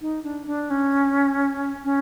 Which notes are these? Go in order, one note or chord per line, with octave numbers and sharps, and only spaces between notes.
D#4
D4
D4
C#4
C#4